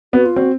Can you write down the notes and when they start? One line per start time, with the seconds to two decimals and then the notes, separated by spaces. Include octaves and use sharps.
0.13 B3 F#4
0.26 F4
0.36 C4 F#4